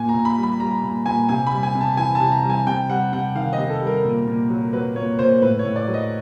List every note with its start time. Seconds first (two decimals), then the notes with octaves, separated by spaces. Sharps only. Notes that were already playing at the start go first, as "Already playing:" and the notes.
Already playing: A#2 G#5
0.09 A#5
0.14 A#2
0.25 B5
0.38 G3
0.43 B5
0.60 G3 A#5
0.83 A#2
1.06 A#2 G#5
1.29 C3 G#5
1.47 B5
1.52 G3
1.63 G#5
1.75 C3
1.81 A5
1.97 E3 G#5
2.15 A5
2.20 C3
2.32 A#5
2.44 G3
2.50 G#5
2.67 C3 G5
2.90 G3 F#5
3.13 C3 F#5
3.35 D#3 F5
3.53 D#5
3.58 C3
3.70 A4
3.81 G3
3.87 A#4
4.05 A#2
4.27 A#2
4.50 F#3
4.73 F#3 B4
4.96 A#2 C#5
5.19 A#2 C5
5.42 A2 B4
5.59 C#5
5.65 A2
5.76 D5
5.88 F#3
5.94 D#5